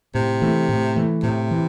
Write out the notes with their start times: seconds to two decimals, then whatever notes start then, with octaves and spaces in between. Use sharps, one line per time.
0.15 A2 C3
0.42 E3 A3
0.69 A2
0.96 E3 A3
1.23 A2 C3
1.51 E3